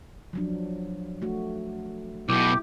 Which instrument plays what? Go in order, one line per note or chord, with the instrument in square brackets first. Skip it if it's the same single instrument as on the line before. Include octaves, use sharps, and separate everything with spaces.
[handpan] F3 F#3 D4
A3 F#4
[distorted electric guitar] B1 B2 [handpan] E4 [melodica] G4